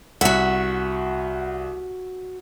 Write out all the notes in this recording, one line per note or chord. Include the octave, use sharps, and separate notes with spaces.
C2 F#4 E5 F#5